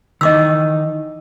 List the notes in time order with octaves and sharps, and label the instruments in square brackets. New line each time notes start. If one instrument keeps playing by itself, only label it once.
[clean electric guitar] D#3 E3 D#4 [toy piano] D#5 D6 E6